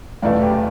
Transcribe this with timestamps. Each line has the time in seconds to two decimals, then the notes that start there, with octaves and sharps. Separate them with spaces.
0.22 F1 E2 B2 A3 D5 F5
0.42 G4 B4